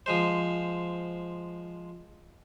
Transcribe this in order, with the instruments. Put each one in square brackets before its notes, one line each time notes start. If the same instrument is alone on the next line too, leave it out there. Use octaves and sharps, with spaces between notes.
[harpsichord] F3 G#3 C5